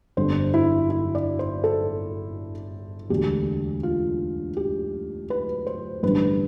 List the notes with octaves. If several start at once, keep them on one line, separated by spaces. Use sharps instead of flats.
G1 F2 D3 G3 C5
E4
E4
D5
C5
A4
E1 D2 D3 G4
F4
G4
B4
C5
A1 G2 D3 G3 B4